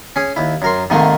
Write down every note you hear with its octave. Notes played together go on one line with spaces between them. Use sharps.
C#4 G#4
D#2 E4
F#2 A#4 C6
G#2 C3 D#3 A3 A#3